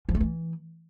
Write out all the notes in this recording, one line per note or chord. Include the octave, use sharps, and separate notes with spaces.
F3
A3
E3